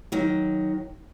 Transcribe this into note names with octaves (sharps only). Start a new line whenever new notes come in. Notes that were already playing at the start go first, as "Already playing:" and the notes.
D#3 F#3